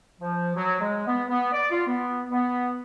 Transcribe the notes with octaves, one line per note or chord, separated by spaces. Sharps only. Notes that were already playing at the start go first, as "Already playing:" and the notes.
F3
F#3
G#3
B3
B3
D5
F4
B3
B3